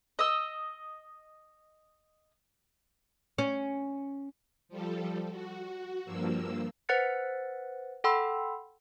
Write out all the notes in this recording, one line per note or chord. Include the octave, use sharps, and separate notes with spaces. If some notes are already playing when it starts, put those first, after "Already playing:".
D#5 E6
C#4
F3 G3 A4
F#4
G2 F3 A#3 E6
B4 C5 F#5 F#6 A6 C#7
A4 F#5 G5 B5 C6 E6